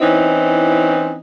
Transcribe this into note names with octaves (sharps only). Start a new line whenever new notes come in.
E3 C4 C#4 D#4 E4